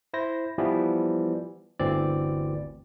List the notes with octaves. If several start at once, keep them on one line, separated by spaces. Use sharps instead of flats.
E4 C5 A#6
E3 F3 G3 B3 E4
G1 D2 E3 C4 D5